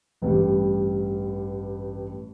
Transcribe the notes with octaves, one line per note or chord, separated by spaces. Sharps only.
A1 G2 G3